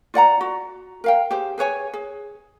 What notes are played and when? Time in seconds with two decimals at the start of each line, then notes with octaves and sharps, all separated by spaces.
0.14 F4 D5 F#5 A#5
0.41 F#4
1.04 A#4 F5 G5
1.31 G4 G#4 C5
1.58 G#4 B4 C#5 G#5
1.94 G#4